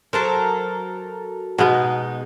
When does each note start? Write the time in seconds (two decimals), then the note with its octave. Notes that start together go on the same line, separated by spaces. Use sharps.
0.13 F#3 A4 A#4 C5
1.59 B2 G#3 B3 D#4